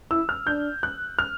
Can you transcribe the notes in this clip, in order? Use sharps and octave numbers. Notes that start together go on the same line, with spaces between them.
E4 E6
F6
D4 G6
F#6
F6